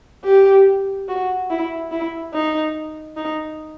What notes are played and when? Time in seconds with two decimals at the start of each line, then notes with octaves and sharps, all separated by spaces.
0.25 G4
1.08 F#4
1.50 E4
1.91 E4
2.33 D#4
3.16 D#4